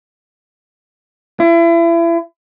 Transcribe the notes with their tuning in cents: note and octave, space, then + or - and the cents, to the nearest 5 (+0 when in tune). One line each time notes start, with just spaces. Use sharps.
E4 +35